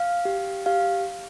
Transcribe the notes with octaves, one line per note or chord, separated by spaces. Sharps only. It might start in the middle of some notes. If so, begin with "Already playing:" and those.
Already playing: F5
G4
G4 F5